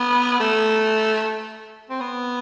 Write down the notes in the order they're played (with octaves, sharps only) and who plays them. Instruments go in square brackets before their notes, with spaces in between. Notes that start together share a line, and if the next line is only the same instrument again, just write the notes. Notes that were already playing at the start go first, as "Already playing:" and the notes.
Already playing: [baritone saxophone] B3
A3
C4
B3